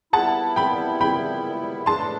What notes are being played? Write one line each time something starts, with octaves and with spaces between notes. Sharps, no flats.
G3 B3 E4 F#5 A5
G5 B5
G5 B5
A2 E3 B3 D4 A5 C6